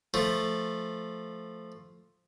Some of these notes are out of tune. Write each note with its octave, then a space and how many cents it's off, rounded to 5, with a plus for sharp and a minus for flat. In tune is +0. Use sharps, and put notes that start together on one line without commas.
F3 +0 A3 +0